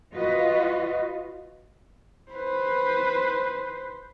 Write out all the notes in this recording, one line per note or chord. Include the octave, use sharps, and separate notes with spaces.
F4 F#4 B4 D#5
B4 C5